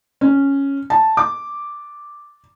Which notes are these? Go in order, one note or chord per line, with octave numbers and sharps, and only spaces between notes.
C#4
A5
D6